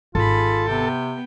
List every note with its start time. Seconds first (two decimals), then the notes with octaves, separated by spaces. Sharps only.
0.15 G#1 F4 G#4 A4 B5
0.68 C3 B3 G5